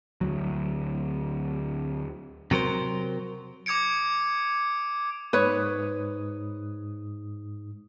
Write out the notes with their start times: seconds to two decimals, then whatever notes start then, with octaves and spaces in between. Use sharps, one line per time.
0.21 D2 F#3
2.51 C3 F#3 A#4 C5
3.66 D6 D#6 G#6 C#7 D7
5.33 G#2 B4 C#5 D#6